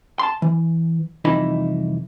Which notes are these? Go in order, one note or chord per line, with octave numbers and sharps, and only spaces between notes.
A5 C6
E3
C2 F2 E3 D#4 E4 B5